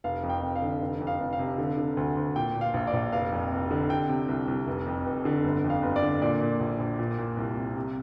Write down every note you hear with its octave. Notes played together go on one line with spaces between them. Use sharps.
F1 F5
F2
G5
F1
F5
D3
F1
F2
F5
F1
F5
C3
D3
D3
D2
D2
A#2 G5
A#2
F5
A#1
D5
A#1
F1 F5
F2
F1
D3
C3 G5
C3
C2
C2
F1
F2
F1
D3
G1
F2
F5
G1
D5
D3
A#2 D5
A#2
A#1
A#1
A#2
A#2
C2
C2
C3